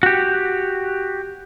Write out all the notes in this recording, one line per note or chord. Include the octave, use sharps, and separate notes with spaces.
F#4 G4